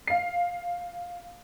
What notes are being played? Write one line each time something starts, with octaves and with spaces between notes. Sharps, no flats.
F5 C7